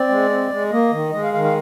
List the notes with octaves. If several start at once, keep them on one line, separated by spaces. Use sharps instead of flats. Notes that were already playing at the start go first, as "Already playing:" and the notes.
Already playing: C4 D5
G#3
C4
G#3
A#3 D#5
D#3
G#3 D#5
F5
D#3 F5
F5